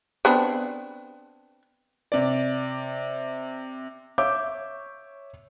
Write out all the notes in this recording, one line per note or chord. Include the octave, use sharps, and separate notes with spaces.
B3 C4 D4
C3 D5
C#5 E5 D6 G6